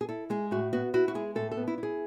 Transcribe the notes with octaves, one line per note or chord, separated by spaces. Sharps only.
G#4
E4 A4
G#3 G#4
A2 F#4
B3 F#4
E4 F#4
F#4
G#3 G#4
A2 A4
A4
B3
E4
E4
G#4